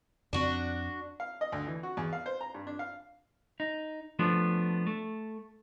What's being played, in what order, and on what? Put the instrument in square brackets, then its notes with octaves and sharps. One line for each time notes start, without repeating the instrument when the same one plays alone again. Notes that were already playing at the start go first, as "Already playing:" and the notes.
[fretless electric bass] F2 C4 [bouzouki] D4 F#4
[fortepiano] F5
D#5
D2
E3
F#4
E2
F5
C5
A#5
G2
D4
F5
[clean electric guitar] D#4
F3 A3 B3 D4
A3